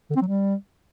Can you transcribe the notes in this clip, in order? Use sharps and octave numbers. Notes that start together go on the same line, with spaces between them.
D3
C4
F#3
G3